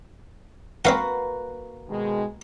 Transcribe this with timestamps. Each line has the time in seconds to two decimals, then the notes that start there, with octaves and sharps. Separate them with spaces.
0.85 A#3 C4 F#4 B4 F5 F#5
1.88 B2 D#3 G#3